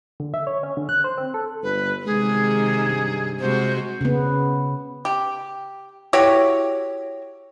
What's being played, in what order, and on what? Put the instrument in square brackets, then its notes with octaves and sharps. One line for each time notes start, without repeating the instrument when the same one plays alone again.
[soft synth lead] D3
E5
C#5
C#4
D3
F#6
C5
C4
A4
[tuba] G1 [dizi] B4
[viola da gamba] C3 D#3 [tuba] G#3 [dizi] G#4
[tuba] G2
[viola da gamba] C3 G#3 F#4 [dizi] C5
[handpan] C#3 B3
[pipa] G4
E4 F#4 G4 C#5